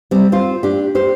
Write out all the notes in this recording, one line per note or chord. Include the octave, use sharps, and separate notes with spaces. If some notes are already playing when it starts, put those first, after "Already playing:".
G3 C4
C4 F4
D4 G4
G4 C5